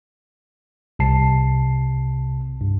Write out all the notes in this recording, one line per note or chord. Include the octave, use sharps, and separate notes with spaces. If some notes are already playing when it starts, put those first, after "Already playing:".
C2 C3 A5 C7
G2